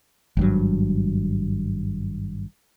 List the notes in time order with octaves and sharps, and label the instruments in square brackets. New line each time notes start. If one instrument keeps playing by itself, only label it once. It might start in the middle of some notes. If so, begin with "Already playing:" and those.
[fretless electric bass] G#1 G2 F#3